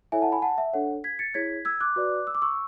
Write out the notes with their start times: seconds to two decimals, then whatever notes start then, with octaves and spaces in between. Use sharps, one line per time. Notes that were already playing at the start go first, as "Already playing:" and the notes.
0.12 E4 A4 C#5 E5 G#5
0.22 F#5 A5
0.32 G#5 B5
0.42 F#5 A5
0.58 E5
0.73 D4 A4 C#5 F#5
1.04 G#6 B6
1.19 A6 C#7
1.34 E4 G#4 C#5 G#6 B6
1.65 E6 G#6
1.80 D6 F#6
1.96 F#4 B4 D5
2.27 E6
2.35 D6
2.42 C#6 E6